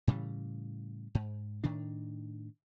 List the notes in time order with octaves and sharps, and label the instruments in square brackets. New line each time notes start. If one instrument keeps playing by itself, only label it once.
[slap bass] A2 C#3 E3 G3
G#2
A2 D#3 D4